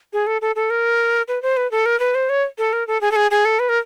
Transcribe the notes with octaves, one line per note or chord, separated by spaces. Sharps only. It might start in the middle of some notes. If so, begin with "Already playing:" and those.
G#4
A4
A4
A4
A#4
B4
C5
B4
A4
A#4
B4
C5
C#5
A4
A#4
A4
G#4
A4
G#4
G#4
A4
B4
A#4